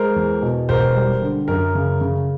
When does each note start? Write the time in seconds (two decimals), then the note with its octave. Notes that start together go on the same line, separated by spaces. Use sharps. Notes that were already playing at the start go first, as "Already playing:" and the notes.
Already playing: G#3 A#4 C5
0.16 E2
0.42 B2
0.69 E1 A#4 C5
0.96 G3
1.22 D3
1.48 F#2 A#4
1.75 C#3
2.01 C#3